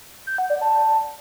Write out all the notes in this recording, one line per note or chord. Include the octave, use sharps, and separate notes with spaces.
G6
F#5
D5
A5